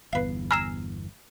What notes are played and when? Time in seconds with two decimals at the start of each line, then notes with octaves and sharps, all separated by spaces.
0.13 G1 E2 B3 B4 F5 C7
0.51 G#5 A#5 E6 F6 C7 E7